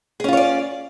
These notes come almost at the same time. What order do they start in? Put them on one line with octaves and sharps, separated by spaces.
G#4 C#4 F4 C#5 D5